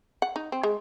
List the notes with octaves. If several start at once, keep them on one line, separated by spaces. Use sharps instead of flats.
F#5
D#4
C4
G#3